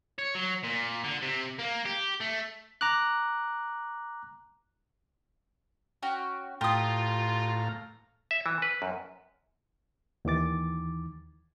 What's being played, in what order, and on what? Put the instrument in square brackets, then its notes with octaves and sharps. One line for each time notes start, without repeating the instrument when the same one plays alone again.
[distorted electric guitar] C#5
F#3
A#2
D3
C3
A#3
G4
A3
[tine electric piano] A#5 D6 F#6
[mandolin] C#4 F#4 G5
[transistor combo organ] A2 F5 A#5 [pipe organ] F4 [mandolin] G4 D#6
[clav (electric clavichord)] E5
E3
B4
F#2
[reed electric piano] D#2 D#3 E3 D6 A6